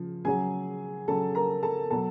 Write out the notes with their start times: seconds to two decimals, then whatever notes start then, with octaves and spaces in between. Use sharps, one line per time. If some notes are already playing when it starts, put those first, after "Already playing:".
Already playing: C#3 F3
0.25 C#3 F#3 G#4 G#5
1.08 C#3 F#3 A4 A5
1.35 A#4 A#5
1.63 A4 A5
1.90 B2 F#3 A4 A5